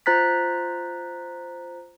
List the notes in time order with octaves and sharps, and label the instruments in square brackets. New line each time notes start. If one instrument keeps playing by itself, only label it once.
[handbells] F4 C5 A#5 F#6 A6 B6